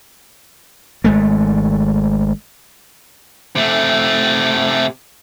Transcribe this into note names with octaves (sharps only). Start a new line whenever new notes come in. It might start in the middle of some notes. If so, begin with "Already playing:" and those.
G#1 G#3 A3
C3 A3